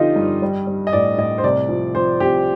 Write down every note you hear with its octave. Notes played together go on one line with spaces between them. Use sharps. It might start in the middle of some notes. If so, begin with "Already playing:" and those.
Already playing: D3 F3 D#4 F4 G4 D#5
G2
G3
G3
D#5
A2 D5
A2 D#5
C5
C2 D5
F3
F3 C5
C2 G4